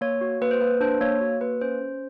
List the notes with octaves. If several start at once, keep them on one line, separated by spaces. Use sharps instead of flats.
A#3 C#5
F#4
A#3 B4
C5
A#3 B4
D4 C5
A#3 C#5
F#4
A#3 B4
C#4 C5
C#4